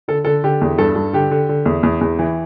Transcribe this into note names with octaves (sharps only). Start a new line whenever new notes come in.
D3 A4
D3 A4
D3 G4
E2
G2 A4
G2
D3 G4
D3
D3
E2
E2
E2
E3